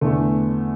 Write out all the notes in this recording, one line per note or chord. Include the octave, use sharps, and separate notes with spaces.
E2 D3 A3